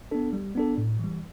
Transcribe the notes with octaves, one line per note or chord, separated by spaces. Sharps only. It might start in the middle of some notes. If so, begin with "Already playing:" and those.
B3 D4 A4
G3
B3 D4 A4
A2
E3 G3